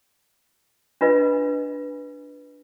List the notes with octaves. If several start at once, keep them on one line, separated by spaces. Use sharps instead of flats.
D4 F4 B4 D#5